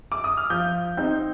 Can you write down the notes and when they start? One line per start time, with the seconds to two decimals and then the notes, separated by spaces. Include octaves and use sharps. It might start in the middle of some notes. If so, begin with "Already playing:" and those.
0.12 D6
0.24 D#6
0.37 F6
0.50 F3 G6
0.97 C4 D#4 G6